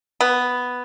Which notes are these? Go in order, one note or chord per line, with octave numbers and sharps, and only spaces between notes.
B3